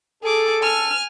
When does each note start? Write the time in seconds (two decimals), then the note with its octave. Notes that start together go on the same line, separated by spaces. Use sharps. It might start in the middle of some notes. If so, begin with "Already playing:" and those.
0.23 G#4 A4 D6
0.62 G#5 F6